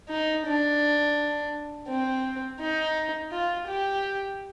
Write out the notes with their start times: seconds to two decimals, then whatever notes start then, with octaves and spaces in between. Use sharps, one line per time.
0.09 D#4
0.46 D4
1.88 C4
2.60 D#4
3.32 F4
3.67 G4